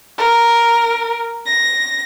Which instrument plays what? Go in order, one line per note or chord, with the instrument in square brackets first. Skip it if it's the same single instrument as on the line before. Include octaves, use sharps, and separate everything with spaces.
[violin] A#4
A#6